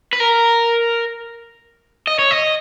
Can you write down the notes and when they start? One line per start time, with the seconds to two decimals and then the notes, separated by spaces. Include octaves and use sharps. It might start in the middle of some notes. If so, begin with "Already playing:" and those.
0.13 B4
0.20 A#4
2.07 D#5
2.19 C#5
2.31 D#5